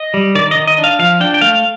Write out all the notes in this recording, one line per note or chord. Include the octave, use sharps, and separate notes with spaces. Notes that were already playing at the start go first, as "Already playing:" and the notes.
Already playing: D#5
G3
D#3 D5
D#5
D#3
D#5
D4
F5
F3 F5
D4 G5
G5
A3 F5